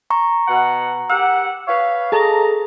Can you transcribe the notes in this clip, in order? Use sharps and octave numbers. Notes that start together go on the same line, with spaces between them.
A#5 C#6
B2 F#5
G4 A#4 F#5 E6
B4 C#5 F5
G#4 A4 D#5 A5 A#5